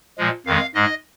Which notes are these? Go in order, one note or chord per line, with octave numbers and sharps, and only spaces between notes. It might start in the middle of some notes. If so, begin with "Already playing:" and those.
A#2 F3 G#3
F2 D#3 G#3 F5
G#2 G#3 D#5